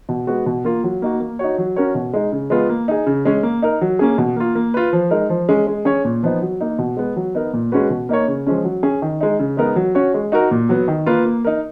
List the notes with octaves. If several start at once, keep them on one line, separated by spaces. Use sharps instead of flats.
B2
G#3 B3 F#4
B2
A#3 F4 A#4
F#3
A#3 D#4 F#4
A#3
D#4 F#4 C#5
F#3
C#4 F#4 A#4 C#5
B2
G#3 D#4
C#3
G#3 B3 F4 B4
A#3
D#4 G#4
C#3
G#3 C#4
A#3
D#4 A#4
F#3
A#3 C#4 G#4
B2
A#3 F4
A#3
F4 B4
F3
G#3 D#4 A#4
F3
G#3 C#4 G#4
G#3
C#4 G#4 C#5
A#2
F3 B3 D#4
F#3
A#3 D#4
B2
G#3 B3
F#3
B3 D#4 A#4
A#2
G#3 C#4 F#4 B4
B2
A#3 D#4 A#4 C#5
C#3
F3 G#3 C#4
F#3
C#4 G#4
D#3
G#3 D#4
C#3
G#3 B3 D#4 A#4
F#3
C#4 F#4 C#5
G#3
D#4 F#4 A#4
A#2
F#3 B3
D#3
A#3 F4 B4
A#3
D#4 A#4